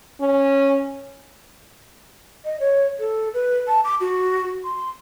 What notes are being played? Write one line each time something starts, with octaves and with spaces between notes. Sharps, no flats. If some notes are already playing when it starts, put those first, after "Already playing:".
C#4
D#5
C#5
A4
B4
A5
D6
F#4
C6